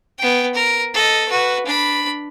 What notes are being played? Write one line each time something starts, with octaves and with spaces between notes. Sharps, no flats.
B3 G5
A#4
A4 D#5
F#4 B4
D4 B5